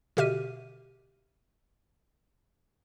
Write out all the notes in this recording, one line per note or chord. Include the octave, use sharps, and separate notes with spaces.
B2 D3 G4 E5 F6 D#7